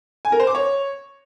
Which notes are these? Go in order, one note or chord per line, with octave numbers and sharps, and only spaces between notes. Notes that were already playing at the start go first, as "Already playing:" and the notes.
G#5
A#4
C5
D6
C#5